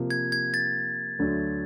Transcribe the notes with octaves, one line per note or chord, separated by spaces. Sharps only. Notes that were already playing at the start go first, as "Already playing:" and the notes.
Already playing: C3 F3 A#3
G#6
G#6
A6
D2 D3 F#3 A3 D4